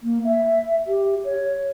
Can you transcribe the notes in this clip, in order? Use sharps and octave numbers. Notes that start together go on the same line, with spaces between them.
A#3
E5
G4
C#5